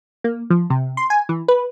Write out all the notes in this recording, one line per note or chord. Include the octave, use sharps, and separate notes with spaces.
A#3
F3
C3
C6
G#5
E3
B4